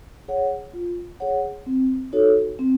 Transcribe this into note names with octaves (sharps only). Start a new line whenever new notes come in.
G#4 C#5 F#5
F4
G#4 C#5 F#5
C4
D#4 F#4 A4 C#5
C4